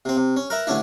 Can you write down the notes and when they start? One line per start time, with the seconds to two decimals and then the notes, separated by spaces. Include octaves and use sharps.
0.05 C3 C4
0.17 C3
0.36 C#4
0.50 A#4 B4 E5
0.67 A1 D3 C#4 D4 E4